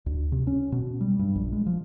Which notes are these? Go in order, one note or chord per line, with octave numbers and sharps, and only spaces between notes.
D2
C3
C#4
B2
G3
G2
A#1
G#3
F3